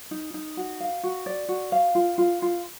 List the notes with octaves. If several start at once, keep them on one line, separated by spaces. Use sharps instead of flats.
D#4
D#4
F#4
F5
F#4
D5
F#4
F5
F4
F4
F4